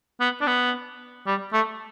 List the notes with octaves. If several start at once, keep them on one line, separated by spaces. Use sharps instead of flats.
B3
D4
B3
G3
A3